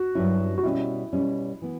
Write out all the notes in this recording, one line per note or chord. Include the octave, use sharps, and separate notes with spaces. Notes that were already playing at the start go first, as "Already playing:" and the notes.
Already playing: F#4
G2 F#3 C#4 E4
F#4
B2 G3 C#4 E4
B2 G3 C#4
E3 B3